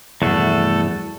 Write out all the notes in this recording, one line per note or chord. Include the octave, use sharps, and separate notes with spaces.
E2 G2 C3 F3 A3 F#4 A4